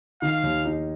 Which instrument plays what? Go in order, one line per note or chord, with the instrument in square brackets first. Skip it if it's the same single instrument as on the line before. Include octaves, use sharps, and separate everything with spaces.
[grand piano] D#3 [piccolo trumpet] F5
[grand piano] D#2
D#4